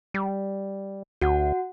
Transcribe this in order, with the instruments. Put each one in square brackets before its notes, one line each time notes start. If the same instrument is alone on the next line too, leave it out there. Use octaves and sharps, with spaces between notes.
[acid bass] G3
[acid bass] D2 [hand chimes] F#4 F#5